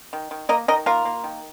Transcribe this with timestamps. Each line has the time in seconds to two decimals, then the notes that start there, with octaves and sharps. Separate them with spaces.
0.13 D#3
0.31 D#3
0.49 A#3 A#4 D#5
0.68 D#3 A#4 D#5
0.86 A#3 F4 A#4
1.05 A#3
1.24 D#3